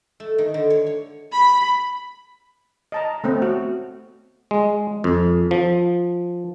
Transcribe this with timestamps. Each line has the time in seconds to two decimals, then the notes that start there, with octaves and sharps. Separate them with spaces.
0.20 A3
0.38 D#3
0.54 D3
0.70 C#5
0.86 C#5
1.32 B5
2.92 D#5 A5 A#5
3.24 A3 B3 C4
3.42 F#4
4.51 G#3
5.04 F2
5.51 F3